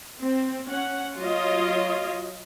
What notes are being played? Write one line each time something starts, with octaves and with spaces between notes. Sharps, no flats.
C4
C#4 F#5
F#3 F4 C#5 D#5 F5